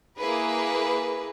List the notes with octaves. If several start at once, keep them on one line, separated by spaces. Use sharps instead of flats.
A#3 E4 G#4 B4